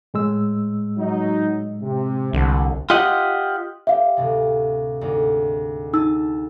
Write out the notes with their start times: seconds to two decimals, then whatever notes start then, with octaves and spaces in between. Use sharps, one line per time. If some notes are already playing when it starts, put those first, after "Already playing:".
0.14 A2 G#3 E6
0.98 F#3 D#4
1.81 C3
2.33 C2 D3
2.90 F4 G4 D#5 F#5
3.87 G4 E5 F5
4.17 D2 A2 C3
5.01 D2 G#2 D#4
5.93 D#4 G#5 A5 E6 A6